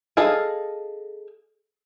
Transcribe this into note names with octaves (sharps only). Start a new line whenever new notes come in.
G#4 A4 D#5 F5